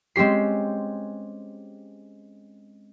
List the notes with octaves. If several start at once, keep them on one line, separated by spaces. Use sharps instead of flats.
G#3 C4 C#4 G4 C7